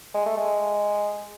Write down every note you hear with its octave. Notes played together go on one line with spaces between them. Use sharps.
G#3
A3
G#3